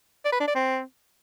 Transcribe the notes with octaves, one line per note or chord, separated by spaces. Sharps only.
D5
B4
D4
D5
C4